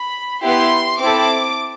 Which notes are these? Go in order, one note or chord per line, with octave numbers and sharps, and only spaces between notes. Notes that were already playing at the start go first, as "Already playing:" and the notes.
Already playing: B5
B3 E4 G4 C6
C4 E4 A4 D6